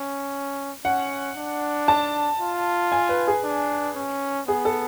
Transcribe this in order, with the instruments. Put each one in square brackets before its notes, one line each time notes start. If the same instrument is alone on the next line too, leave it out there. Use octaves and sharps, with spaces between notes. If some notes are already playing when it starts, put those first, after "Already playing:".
Already playing: [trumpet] C#4
[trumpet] C#4 [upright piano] F#5
[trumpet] D4
[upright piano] A5
[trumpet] F4
[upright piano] G#5
B4
G#4
[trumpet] D4
C#4
[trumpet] B3 [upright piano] G#4
[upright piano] A4